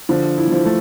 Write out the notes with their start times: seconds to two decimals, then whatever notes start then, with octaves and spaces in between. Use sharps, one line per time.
0.09 D3 F3
0.38 E4
0.47 E3
0.52 F3
0.65 A3